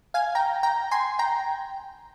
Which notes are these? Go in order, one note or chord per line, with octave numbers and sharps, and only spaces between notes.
F5 G#5
G5 A#5
G5 A#5
G#5 C6
G5 A#5